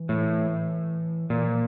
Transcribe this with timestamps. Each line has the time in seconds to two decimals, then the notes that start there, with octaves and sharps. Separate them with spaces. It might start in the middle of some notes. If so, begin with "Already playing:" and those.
Already playing: E3
0.09 A2
1.30 A#2 E3
1.45 F3